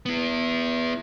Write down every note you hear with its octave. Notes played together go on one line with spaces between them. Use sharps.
B3 E4